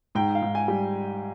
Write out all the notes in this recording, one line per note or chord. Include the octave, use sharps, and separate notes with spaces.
G#2 G5
F5
G#2
G#5
G3